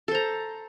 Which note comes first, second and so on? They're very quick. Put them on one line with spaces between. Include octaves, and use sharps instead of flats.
A4 C5 A#5